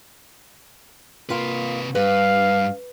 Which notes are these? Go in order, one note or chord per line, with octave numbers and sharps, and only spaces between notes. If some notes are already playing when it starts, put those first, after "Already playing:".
C3 A#3 F4 B4 F5
G2 B4 F5